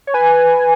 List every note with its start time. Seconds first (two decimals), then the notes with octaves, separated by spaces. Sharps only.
0.07 C#5
0.14 B4 G#5